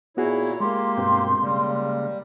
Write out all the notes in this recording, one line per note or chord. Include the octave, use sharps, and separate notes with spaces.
A#2 B3 E4 F#4 G#4 C#5
G#3 A#3 G4 C6
G2 B2 C4
C#3 G3 A#3